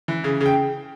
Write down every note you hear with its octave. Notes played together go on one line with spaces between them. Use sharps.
E3
C#3
C#3
G5